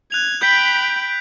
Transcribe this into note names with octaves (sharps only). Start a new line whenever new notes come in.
F#6 G#6 F7
G5 B5 G6 B6 D7